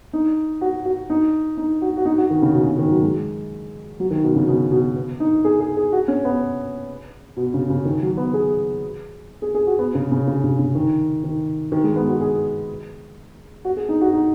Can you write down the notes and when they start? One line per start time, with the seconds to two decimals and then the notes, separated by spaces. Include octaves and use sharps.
0.13 D#4
0.61 F#4
0.85 F#4
1.10 D#4
1.57 D#4
1.82 F#4
1.97 F#4
2.05 D#4
2.18 F#4
2.30 D#3
2.42 C#3
2.54 B2
2.66 C#3
2.79 D#3
2.91 F#3
3.02 G#3
4.00 F#3
4.11 D#3
4.24 B2
4.36 C#3
4.48 B2
4.72 B2
4.96 B3
5.20 D#4
5.45 G#4
5.60 G#4
5.77 G#4
5.92 F#4
6.08 C#4
6.25 B3
7.37 B2
7.54 C#3
7.70 C#3
7.85 D#3
8.02 F#3
8.17 B3
8.34 G#4
9.42 G#4
9.55 G#4
9.67 F#4
9.79 B3
9.95 C#3
10.12 C#3
10.27 C#3
10.44 C#3
10.59 C#3
10.75 D#3
11.24 D#3
11.72 D#3
11.84 G#3
11.96 B3
12.08 F#4
12.21 G#4
13.65 F#4
13.77 G#4
13.89 D#4
14.01 F#4
14.13 D#4